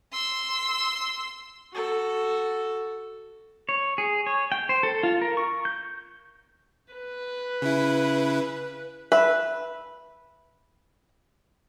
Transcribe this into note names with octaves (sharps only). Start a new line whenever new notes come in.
C6 E6
F#4 A4
C#5
G#4
C#5
G5
C5
A4
F4
A#4
C#6
G6
B4
C#3 E4
B4 E5